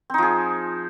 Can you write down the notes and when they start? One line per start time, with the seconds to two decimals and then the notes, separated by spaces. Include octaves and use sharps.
0.10 C4
0.14 D#4
0.18 F3
0.23 G#4